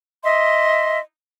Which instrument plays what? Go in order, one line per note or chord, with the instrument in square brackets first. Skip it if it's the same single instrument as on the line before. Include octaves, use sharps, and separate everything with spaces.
[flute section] D#5 E5 C6